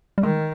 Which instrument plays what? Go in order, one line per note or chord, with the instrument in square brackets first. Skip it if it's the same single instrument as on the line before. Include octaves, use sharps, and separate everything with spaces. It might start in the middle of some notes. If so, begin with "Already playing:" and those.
[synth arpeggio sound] G3
[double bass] D#3 [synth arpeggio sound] G#3